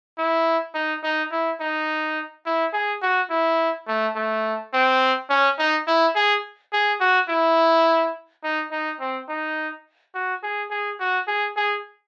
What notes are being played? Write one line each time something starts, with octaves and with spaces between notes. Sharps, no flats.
E4
D#4
D#4
E4
D#4
E4
G#4
F#4
E4
A3
A3
C4
C#4
D#4
E4
G#4
G#4
F#4
E4
D#4
D#4
C4
D#4
F#4
G#4
G#4
F#4
G#4
G#4